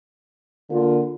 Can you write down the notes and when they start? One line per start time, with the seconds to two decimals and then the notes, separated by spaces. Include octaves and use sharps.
0.69 D3 A#3 F4